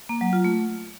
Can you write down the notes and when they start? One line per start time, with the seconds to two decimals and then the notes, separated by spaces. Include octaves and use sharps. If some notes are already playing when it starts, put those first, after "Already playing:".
0.09 A#3
0.21 F#3
0.33 F4
0.44 A3